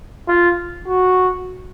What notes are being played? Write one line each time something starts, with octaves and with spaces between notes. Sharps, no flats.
F4
F#4